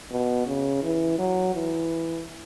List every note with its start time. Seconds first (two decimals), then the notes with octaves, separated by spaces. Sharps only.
0.11 B2
0.47 C#3
0.83 E3
1.19 F#3
1.54 E3